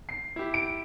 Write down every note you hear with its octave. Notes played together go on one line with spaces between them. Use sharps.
C7
E4 G4
D7